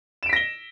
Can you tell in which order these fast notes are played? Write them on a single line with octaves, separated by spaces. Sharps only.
E7 D7 B6 A#6 G7